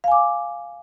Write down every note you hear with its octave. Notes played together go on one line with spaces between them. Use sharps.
F5 G#5 D6